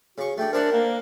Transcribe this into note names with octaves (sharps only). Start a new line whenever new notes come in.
C#3 F#4 C#6
A3 D4 G5
C4 D4 G4 A#4 F#5
A#3